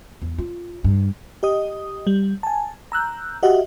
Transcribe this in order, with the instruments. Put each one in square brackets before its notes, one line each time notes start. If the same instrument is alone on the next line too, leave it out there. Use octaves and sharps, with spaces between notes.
[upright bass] E2
F4
G2
[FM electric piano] G4 D#5 D#6
G3
G#5 A5
A#5 E6 F#6 G6
F#4 G4 D#5 E5 F#5